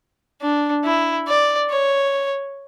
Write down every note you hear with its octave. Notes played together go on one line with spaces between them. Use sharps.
D4
E4
D5
C#5